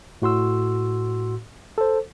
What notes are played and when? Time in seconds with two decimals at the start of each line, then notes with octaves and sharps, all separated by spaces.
0.22 A2 F#4 C6 E6
1.78 A4 C5